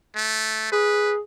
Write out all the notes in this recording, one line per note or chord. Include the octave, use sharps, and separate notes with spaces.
A3
G#4 B4